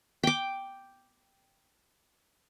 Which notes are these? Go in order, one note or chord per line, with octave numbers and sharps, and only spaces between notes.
G5 D6